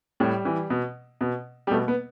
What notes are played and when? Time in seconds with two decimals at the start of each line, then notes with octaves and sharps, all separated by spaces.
0.20 A2 G3
0.45 E3
0.70 B2
1.21 B2
1.67 G3
1.71 B2 A3
1.88 B3